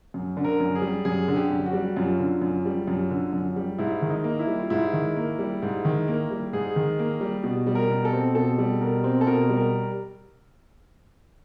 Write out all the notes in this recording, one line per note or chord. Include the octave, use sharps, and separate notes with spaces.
F#2
D3
A#4
F#2
G#4
G3
F#2 G#4
D3
G4
F#2
F#4
G3
F#2 F4
D3
F#2
G3
F#2
D3
F#2
G3
G#2 E4
D#3
D#4
A#3
E4
G3
F4
G#2 E4
D#3
A#3
G3
G#2
D#3
A#3
G3
G#2 G#4
D#3
A#3
G3
B2
G3
A#4
B2
A4
C4
B2 A4
G3
B2 A#4
C4
A4
B2 A#4
G3
A#4